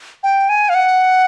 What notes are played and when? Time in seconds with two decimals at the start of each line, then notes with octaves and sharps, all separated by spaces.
0.23 G5
0.49 G#5
0.69 F5
0.75 F#5